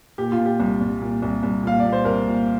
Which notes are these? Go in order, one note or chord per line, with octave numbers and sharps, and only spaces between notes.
A#2 G4
F4
A#2
G4
C2
C2
A#2
C2
C2
A#2 F5
D5
A#2
C5
C2 A#4
A#2